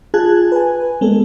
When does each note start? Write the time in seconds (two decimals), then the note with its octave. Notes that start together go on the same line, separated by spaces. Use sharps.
0.14 F4 G#4 A5 F#6 G#6
0.52 B4 G#5
1.01 G#3 A#3 B3 A4